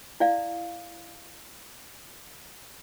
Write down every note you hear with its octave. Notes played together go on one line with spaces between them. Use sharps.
E4 D5 F5